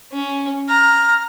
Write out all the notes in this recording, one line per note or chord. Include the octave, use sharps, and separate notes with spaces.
C#4
A#5 F6